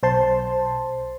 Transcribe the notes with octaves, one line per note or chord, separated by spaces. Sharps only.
B1 C5 A5 C6